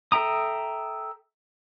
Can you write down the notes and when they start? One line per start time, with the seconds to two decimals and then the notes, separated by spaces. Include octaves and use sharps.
0.12 A4 E5 G5 A#5 D#6